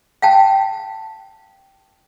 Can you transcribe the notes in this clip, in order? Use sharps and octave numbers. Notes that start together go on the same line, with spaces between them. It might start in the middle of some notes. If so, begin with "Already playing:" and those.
F5 G5 A5